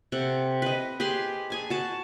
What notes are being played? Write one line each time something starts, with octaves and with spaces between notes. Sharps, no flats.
C3 A4 F#5
B4 D#5
G4 G#4 B4 C6
G#4 G#5 A5
F#4 A5